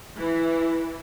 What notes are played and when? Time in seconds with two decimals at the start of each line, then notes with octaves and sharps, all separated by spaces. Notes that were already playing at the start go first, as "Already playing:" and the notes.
0.16 E3